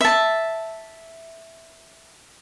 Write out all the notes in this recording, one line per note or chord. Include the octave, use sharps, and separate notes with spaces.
E5 A5